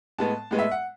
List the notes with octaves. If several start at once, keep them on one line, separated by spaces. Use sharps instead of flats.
A2 G#3 B3 A5
A2 G#3 B3
E5
F#5